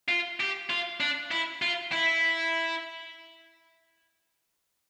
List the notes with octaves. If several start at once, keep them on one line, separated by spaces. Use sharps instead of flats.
F4
G4
F4
D4
E4
F4
E4